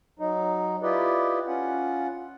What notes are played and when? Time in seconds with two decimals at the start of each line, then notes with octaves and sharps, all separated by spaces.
0.19 F#3 D#4
0.83 E4 F4 G4 B4 D5 D#5
1.47 C#4 F4 F#5